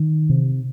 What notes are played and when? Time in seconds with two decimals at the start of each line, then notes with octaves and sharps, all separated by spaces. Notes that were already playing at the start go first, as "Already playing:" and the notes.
Already playing: D#3
0.29 C3